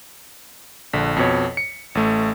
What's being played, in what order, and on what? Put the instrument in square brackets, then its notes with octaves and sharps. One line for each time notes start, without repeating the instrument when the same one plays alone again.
[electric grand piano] A#1 D3 B6
F2 B2 C#5
C#7
A1 A3